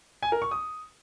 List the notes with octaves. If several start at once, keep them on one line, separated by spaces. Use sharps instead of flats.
G#5
A#4
C#6
D#6